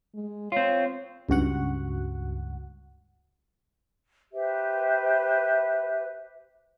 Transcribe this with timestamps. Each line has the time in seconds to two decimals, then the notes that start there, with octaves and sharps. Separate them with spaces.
0.15 G#3
0.52 C4 F4 C#5
1.29 C#2 G2 F#4 F#5
4.32 G4 B4 C5 E5